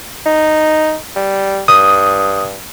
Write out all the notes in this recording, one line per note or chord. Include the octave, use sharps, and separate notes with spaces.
D#4
G3
G2 D#6